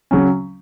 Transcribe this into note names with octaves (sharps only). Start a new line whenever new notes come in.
C#3 F#3 C#4